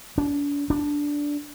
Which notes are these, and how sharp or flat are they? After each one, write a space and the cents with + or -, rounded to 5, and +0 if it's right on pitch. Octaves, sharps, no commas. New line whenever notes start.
D4 -40
D4 -10